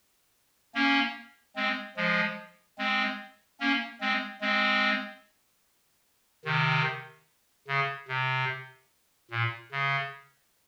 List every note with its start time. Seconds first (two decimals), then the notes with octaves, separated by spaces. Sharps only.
0.75 A#3 C#4
1.56 G#3 C4
1.97 F3 G#3
2.78 G#3 C4
3.60 A#3 C#4
4.01 G#3 C4
4.41 G#3 C4
6.45 C3 D#3
7.68 C#3
8.08 C3
9.31 A#2
9.72 C#3